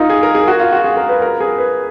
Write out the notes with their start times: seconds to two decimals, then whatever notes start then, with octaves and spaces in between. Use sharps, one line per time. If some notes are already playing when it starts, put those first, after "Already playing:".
Already playing: D#4 F4 A#4
0.10 G#4
0.23 A#4
0.35 G#4
0.48 F#4
0.59 F4
0.72 F#4
0.84 G#4
0.97 A#4
1.09 B4
1.22 A#4
1.40 G#4
1.58 B4